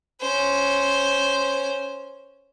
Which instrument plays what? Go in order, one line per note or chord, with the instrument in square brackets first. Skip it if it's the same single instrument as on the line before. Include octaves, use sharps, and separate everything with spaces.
[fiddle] C#4 C5